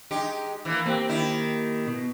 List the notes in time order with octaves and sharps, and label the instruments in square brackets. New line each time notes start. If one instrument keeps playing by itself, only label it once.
[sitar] G#3 D#4 G4
E3 A#3
[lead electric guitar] A#3 G4 [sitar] C4
[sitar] D#3 E4
[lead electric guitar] B2